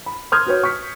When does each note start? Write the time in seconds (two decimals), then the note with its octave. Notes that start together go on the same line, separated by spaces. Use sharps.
0.06 B5
0.32 C6 D#6 F6 G6 G#6
0.47 F#4 B4 C#5
0.63 C#6 G6 B6